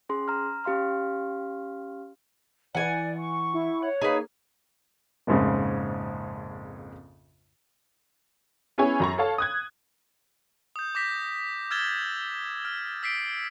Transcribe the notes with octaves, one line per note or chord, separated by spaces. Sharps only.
C#4 G#4 C6
A#5 F6
C#4 G4 F5 C6 F6
E3 D5 F#5 G#5
C#6
E4
C#5 F#5
A#3 D#4 G#4 B4
A#1 F2 G#2 C#3 G#3
B3 C#4 E4 G#4 C#5 G#5
F#2 A#5 C#6
A4 C#5 F5 A5
D#6 F#6 G#6
D#6 G6
D6 G6 A#6 B6
E6 F6 G#6 A6 E7 G7
F6
E6 B6 C7 D7